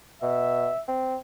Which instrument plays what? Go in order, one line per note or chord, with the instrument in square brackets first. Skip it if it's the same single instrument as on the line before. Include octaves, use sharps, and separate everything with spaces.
[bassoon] B2 [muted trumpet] E5
[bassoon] C4